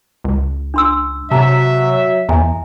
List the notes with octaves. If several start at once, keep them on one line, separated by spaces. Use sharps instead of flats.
C#2
D4 C6 E6
C3 F#3 E5 A5 A#5
E2 E5 G#5 A#5